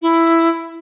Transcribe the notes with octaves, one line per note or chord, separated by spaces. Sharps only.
E4